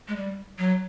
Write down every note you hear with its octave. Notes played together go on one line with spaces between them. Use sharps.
G#3
G3
F#3